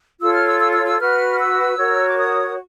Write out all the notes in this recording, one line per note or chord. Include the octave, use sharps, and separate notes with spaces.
F4 A4 C#5 E6
F6
E6
E6
E6
E6
F#4 B4 F6
E6
F#4 A#4 C#5
D6
D#6